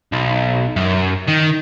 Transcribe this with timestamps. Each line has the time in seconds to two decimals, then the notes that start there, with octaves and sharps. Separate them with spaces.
0.12 B1
0.76 F#2
1.27 D#3